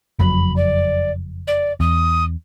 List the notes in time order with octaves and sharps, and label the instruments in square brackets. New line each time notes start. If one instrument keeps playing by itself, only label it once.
[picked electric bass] F#1 F2 F#3 [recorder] B5
[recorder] D5
D5
[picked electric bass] E2 [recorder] D#6